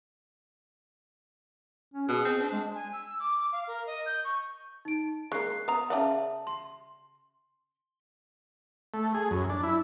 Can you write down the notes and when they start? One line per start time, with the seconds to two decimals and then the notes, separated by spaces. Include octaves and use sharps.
1.94 C#4
2.08 B2 G#4
2.25 C4
2.40 D4
2.52 G#3
2.75 G#5
2.93 E6
3.19 D6
3.53 F5
3.67 A#4
3.87 D#5
4.06 G6
4.25 C#6
4.85 D#4 D7
5.32 G#3 A#3 C#6 F#6 C7
5.68 B3 A#5 D#6
5.90 C#3 D5 E5 F#5 A5
6.47 C6
8.94 A3
9.14 G#4
9.31 F#2
9.49 D4
9.63 E4